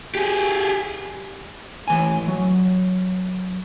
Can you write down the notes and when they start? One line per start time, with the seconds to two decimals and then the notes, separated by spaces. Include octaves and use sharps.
0.15 G4 G#4
1.88 A2 E3 G#5
2.28 F#3